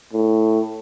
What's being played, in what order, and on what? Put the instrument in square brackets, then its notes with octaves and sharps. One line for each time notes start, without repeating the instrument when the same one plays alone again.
[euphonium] A2